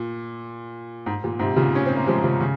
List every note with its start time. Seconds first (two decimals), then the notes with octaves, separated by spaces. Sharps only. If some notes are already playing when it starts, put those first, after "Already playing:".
Already playing: A#2
1.06 G#2
1.24 A#2
1.39 G#2 C3
1.56 A#2 C#3
1.75 C#4
1.86 C4
1.96 A#3
2.07 F3 G#3
2.23 C#3 F3
2.40 C#3